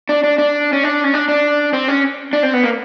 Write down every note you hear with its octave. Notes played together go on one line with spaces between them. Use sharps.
D4
D4
D4
C#4
D4
C#4
D4
D4
C4
C#4
D4
C4
B3
A#3